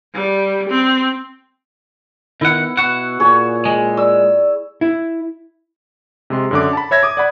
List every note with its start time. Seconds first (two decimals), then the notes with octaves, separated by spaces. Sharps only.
0.14 G3
0.70 C4
2.41 D#3 B3 E4 F#5
2.77 B2 F#4 F#5
3.20 A#2 G#4 C#5
3.65 G#3 G#5
3.97 D5 E6
4.81 E4
6.30 C3 G#3 C6
6.51 F#2 D3 D6
6.73 A5 B5
6.91 C#5 E5 G#6 A#6
7.03 D6 D#6
7.17 D5 F#5 B5